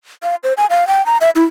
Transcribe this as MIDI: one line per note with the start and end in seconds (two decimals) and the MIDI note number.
0.23 0.35 77
0.44 0.53 72
0.57 0.66 80
0.70 0.87 77
0.88 1.04 79
1.06 1.17 82
1.21 1.30 76
1.35 1.44 64